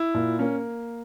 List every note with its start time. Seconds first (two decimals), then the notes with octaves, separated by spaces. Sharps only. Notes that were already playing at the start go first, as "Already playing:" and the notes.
Already playing: E4
0.14 A#2
0.39 A#3 C#4